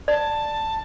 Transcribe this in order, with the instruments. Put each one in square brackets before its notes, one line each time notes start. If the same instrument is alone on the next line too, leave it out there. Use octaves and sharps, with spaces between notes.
[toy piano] D5 [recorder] A5